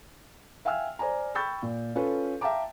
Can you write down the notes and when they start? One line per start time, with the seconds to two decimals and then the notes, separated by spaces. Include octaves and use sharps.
0.65 E5 F5 G5 G#5 E6 F6
0.99 C5 D5 G#5 A#5
1.35 G5 B5 C#6 E6 G6 A6
1.62 A#2
1.95 C#4 F4 A4 B4
2.41 E5 F5 G5 A5 A#5 D6